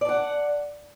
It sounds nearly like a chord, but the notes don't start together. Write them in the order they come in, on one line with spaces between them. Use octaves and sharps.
D5 A5 F#5